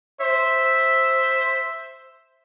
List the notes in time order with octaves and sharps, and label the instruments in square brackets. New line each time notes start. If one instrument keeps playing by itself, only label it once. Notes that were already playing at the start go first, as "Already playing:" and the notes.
[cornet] C5 [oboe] E5